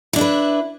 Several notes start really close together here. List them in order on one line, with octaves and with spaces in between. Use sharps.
E4 D4 E5 B4